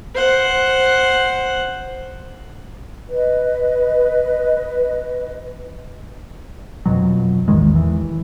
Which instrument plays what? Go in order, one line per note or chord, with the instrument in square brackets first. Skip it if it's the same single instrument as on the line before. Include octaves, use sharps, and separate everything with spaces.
[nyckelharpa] C5 F#5
[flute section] B4 D#5
[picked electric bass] F2 B2 F#3
A1 E2 D#3 G#3
E3